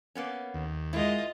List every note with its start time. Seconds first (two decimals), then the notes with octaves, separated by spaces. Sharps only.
0.15 A#3 B3 C#4
0.54 D#2
0.93 G#3 E4 F4 A#4 D#5